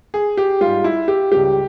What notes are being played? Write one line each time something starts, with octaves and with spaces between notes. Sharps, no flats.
G#4
G4
G#2 G3 F4
E4
G4
C#2 C#3 G3 G4